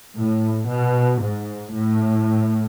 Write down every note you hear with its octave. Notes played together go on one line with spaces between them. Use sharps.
A2
B2
G#2
A2